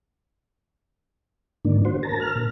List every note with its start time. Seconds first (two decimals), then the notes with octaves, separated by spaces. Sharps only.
1.65 G#2 D3 D#3 A#3 D4
1.85 F#4 C5
2.03 A#4 A5 A#5
2.20 A#4 F6
2.35 A#2